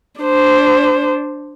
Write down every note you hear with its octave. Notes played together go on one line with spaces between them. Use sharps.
D4 C5